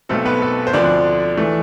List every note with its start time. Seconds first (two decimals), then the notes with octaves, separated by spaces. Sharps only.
0.09 B1 B2 A3 C4 A4
0.25 B3 B4
0.42 A4
0.67 C5
0.73 D2 D3 F3 C4 D4 D5
1.37 E3 A3